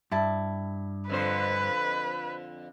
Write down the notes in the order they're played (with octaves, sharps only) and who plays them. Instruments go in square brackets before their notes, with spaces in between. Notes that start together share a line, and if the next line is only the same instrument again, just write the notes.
[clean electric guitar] G2 [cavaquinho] E4 A5
[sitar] F2 D3 C5 [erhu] B4